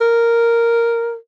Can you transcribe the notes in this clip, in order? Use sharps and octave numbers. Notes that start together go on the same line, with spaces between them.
A#4